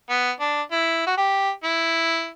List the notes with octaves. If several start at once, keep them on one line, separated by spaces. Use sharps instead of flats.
B3
D4
E4
F#4
G4
E4